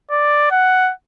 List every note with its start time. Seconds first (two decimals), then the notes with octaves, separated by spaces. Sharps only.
0.11 D5
0.51 F#5